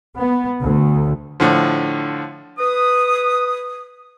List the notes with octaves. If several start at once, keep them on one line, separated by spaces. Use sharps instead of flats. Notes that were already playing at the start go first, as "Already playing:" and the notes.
B3
D2
A2 D3 F3
B4 D#6